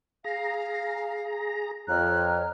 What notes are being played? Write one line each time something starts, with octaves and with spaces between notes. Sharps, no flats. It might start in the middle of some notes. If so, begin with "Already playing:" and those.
G#4 F5 A#5
F2 C#5 A#5 F6 F#6